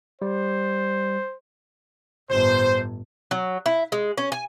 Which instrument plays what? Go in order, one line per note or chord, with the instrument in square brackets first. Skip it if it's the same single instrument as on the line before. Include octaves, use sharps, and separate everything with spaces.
[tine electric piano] G3 [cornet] C5
[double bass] G1 A2 [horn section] C5
[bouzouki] F#3
E4
G#3
C#4
G#5